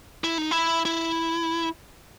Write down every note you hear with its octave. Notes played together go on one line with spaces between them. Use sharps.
E4
D#4
E4
E4